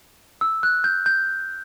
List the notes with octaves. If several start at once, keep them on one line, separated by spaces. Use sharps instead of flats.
E6
F#6
G6
G6